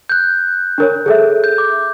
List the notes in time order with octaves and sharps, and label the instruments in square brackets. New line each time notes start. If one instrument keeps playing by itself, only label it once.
[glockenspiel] F#6 G6
[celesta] D4 A#4 C#5
G#4 A4 E5
[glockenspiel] G6
D6